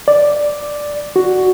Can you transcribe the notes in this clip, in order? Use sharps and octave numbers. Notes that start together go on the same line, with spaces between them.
D5
F#4